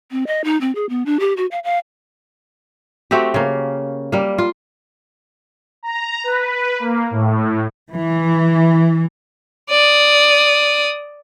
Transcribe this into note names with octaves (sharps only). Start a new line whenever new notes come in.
C4
D#5
D#4
C4
G#4
B3
D4
G4
F#4
F5
F5
A3 C4 F#4 G4
C#3 A#3
G3 A#3
F4
A#5
B4
A#3
A2
E3
D5 D#6